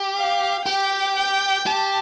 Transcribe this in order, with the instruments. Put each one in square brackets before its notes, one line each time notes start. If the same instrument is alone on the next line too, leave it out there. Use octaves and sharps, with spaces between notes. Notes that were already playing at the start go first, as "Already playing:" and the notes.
Already playing: [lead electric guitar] G4
[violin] F5
[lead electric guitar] G4 [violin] G5
[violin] G5
[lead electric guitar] G4 [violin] A5